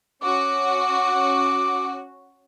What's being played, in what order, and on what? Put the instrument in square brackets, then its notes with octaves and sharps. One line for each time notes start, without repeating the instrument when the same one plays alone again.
[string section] C#4 F#4 [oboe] D6